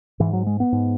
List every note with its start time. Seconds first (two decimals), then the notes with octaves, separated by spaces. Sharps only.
0.20 G#2 E3
0.33 F#3
0.47 G#3
0.60 B3
0.72 G#2